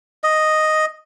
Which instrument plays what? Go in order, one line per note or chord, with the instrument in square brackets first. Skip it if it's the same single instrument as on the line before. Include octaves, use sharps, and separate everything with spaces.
[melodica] D#5